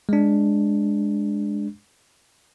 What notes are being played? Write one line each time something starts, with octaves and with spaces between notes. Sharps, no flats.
G#3 D4